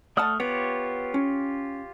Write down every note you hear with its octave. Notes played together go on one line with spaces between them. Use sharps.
A3 D5 F#5 A5 D#6 F6
B3 F4 G4 C#5
C#4